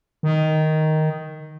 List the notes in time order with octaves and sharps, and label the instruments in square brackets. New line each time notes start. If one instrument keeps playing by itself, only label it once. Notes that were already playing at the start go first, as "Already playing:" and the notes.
[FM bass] D#3